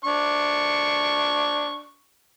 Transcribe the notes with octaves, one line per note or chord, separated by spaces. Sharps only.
D4 C#6